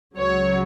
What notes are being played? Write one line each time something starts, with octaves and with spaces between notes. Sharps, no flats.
C#2 C#3 F#3 C#5